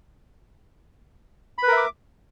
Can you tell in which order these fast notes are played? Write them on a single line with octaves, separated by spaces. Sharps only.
B5 B4 A#4 E5 D6